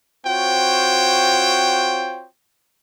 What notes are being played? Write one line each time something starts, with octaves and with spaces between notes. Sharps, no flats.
C4 F4 F#4 C5 C#5 G5